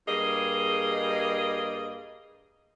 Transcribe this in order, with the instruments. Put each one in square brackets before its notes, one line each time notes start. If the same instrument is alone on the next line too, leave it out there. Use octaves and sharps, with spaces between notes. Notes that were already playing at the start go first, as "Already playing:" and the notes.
[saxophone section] G2 G3 A#3 G#4 D#5